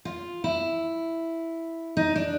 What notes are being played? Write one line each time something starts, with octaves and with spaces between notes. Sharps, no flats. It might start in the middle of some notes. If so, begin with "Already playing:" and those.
F4
E4
D#4
D4